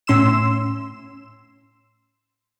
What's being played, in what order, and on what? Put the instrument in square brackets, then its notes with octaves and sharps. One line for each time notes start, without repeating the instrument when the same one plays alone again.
[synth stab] A2 C#4 C6 E6 E7